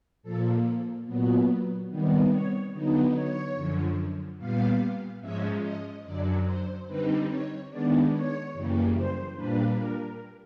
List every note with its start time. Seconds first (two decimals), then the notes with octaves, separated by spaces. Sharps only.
0.23 A#2 F3 A#3 A4
1.06 A#2 F#3 B3
1.89 C3 D#3 G3 B3
2.31 C#5
2.72 D3 F#3 B3 D#4
3.13 C#5
3.55 F#2 D3 F3
4.38 A#2 G3 B3 F5
5.21 G#2 F3 G#3 C#4 E5
5.62 D#5
6.04 F#2 D3 F#3 D5
6.46 C5
6.87 D3 G3 C4 D#4 B4
7.28 C#5
7.70 D#3 G#3 B3 D4 D5
8.11 C#5
8.53 F#2 C#3 E3 G3 A#3
8.95 C5
9.36 A#2 G3 A#3 D4 B4
9.77 A#4